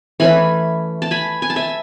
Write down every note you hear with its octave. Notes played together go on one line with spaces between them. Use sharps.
E3 A3 C#4 G#5 B5
A5
G#5 B5
G#5
A5
E5 G#5